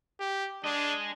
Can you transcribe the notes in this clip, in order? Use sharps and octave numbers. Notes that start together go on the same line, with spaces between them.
G4
D4 G#4 D#5